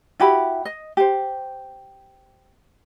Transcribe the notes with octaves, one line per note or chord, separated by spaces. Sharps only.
E4 F#4 G4 B5
D#5
G4 C5